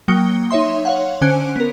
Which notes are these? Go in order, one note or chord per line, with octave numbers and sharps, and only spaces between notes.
F#3 A#3 G5 D#6 C#7 G7
D#4 C#5 E5 C6
C#5 F5 F#5
D3 C#4 C5 G#5 F#6 D7
B3 A#4